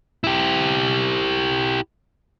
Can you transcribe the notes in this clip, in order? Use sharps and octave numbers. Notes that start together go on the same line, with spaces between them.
E4 G4